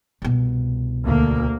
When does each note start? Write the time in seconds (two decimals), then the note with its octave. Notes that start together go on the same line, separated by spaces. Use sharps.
0.22 C2 B2
1.03 D2 A#3